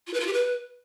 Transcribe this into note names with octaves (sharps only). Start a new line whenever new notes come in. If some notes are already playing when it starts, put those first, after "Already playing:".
F4
B4
F4
G4
B4